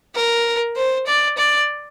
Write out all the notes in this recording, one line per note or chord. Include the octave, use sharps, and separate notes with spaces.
A#4
C5
D5
D5